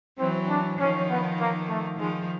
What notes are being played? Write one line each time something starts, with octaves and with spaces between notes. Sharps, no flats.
E3 F#3 C4
D4
D#3 F3 C#4
B3
A#3
A3
D#3 F3 G#3